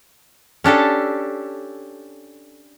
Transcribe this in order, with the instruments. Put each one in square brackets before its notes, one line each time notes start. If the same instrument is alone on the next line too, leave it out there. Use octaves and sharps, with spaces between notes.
[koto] C#4 D4 G4 A4